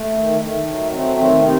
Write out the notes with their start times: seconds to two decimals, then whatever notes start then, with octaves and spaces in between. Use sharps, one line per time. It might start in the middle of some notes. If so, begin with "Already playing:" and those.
Already playing: A3
0.17 D#3
0.41 D#3 A3
0.67 F#3
0.92 A3 C4
1.17 D#3 C4
1.42 C3 C4 D#4